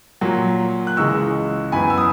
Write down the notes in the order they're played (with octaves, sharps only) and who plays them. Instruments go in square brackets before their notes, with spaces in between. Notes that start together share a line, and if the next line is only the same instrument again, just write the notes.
[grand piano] A#2 F#3 A#3
F#6
C#2 C#3 E3 G#3 C#6 E6
F#2 E3 B3 G#5 B5
E6
D#6